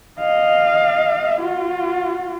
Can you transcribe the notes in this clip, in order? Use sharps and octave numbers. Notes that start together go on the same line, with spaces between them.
D#5 F5
F4 F#4